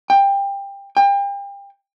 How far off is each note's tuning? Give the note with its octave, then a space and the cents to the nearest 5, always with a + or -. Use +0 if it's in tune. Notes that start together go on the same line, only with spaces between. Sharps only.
G5 +20
G5 +35